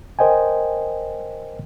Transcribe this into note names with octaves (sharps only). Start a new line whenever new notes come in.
A#4 C5 D#5 G5 G#5